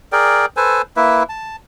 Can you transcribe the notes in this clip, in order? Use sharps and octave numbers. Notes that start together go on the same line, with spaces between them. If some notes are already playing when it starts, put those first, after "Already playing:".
G#4 A#4 D5 G5
A4 B4 C5 G#5
A#3 E4 B4 E5
A5